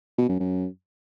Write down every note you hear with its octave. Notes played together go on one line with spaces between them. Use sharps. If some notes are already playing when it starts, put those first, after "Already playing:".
B2
F#2
F#2